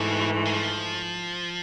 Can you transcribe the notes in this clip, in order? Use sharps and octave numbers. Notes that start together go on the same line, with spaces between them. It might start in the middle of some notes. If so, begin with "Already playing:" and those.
Already playing: G#2 B2 E3 A3
G#3
F3